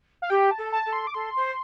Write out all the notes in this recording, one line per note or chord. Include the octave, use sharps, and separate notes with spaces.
F5
G4 G5
A5
A4
A5
A4
C6
D6
A4 C6
C5